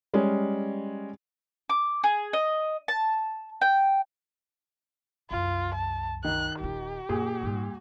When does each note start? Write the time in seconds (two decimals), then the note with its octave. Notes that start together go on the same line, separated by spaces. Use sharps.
0.14 G3 G#3 C#4
1.70 D6
2.04 G#4
2.33 D#5
2.88 A5
3.61 G5
5.31 C2 F#2 F4
5.75 A5
6.24 D#3 F#6
6.60 D#1 F4 G4
7.09 F#2 A#2 G#4
7.43 G#2 G3